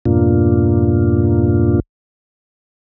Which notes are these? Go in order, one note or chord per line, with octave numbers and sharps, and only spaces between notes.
F2 G#2 B2 A#3 D4 F4